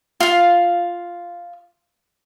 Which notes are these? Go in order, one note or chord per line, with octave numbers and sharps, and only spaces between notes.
F4 F5